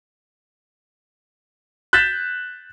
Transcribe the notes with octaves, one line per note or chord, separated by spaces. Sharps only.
F#6 G6 A6 B6 E7